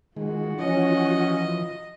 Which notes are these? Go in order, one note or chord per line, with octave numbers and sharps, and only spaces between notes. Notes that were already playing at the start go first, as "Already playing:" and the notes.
D#3 G#3 F4 F#4
E3 F3 C#4 D#5